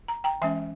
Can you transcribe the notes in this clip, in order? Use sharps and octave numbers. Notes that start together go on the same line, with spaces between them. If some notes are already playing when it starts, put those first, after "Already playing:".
A#5
G5 A#5
E3 G#3 C#4 E5 G#5